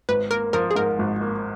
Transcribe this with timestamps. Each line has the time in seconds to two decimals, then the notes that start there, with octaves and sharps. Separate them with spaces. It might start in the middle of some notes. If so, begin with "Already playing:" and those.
0.09 G#1 B4
0.30 A#3 A#4
0.53 F3 A#4
0.71 G#4
0.76 G#2 A#4
0.99 G#1
1.21 A#3